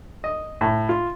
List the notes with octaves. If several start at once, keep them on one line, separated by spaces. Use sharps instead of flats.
D#5
A2
F4